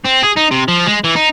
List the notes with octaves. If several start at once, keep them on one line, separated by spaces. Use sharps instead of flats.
C4
G#4
D#4
C3
F3
G#3
E3
D#4